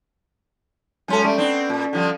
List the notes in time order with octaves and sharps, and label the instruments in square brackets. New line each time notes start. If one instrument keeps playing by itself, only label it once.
[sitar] F#2 C#4 A4 [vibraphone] G#3 A5 C6
[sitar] G3 A3 [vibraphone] C#4 D5
[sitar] B3 C4 D4
A#2
D3 F3 G3